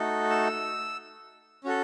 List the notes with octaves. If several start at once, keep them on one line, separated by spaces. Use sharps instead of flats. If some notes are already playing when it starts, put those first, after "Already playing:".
Already playing: A3 D#4 F#4 A4
E6
C#4 F#4 A4